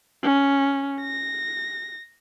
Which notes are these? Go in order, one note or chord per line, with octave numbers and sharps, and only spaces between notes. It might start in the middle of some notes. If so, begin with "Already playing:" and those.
C#4
A#6